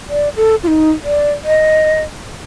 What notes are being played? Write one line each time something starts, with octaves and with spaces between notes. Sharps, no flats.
D5
A4
F4
D#4
D5
D#5